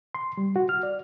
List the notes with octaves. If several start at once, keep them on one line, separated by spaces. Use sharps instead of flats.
C6
G3
F#4
F6
D5